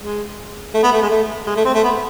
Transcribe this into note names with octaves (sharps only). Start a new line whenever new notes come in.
G#3
A3
B3
A3
G#3
A3
G#3
A3
C4
A3
B3